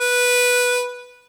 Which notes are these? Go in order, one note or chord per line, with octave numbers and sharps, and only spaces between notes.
B4